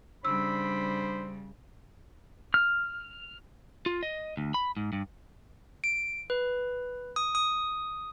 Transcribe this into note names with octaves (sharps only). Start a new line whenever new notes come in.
C#3 G3 D4 C5 B5 E6
F6
F4
D#5
D2
B5
G#2
G2
D7
B4
D#6
D#6